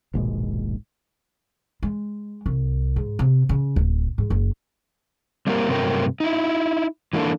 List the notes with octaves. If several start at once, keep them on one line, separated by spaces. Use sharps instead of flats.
D#1 A#1 G#2 B2
G#3
C2
G#2
C3
C#3
D1
G#2
F#1
G3 A#3 C4 G4 A#4
G2 C3 F#3 A3 A#4 G5
D#4 E4
E3 G3 A#3 D4 A4